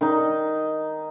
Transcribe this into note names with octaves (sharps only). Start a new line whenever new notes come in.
D#3 D#4